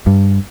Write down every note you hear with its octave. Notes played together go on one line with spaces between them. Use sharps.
G2